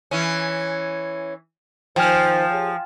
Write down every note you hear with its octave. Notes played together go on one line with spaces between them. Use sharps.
E3 C#4
D#3 F3 C5 G5 G#5 F6
G4 G#4 C#5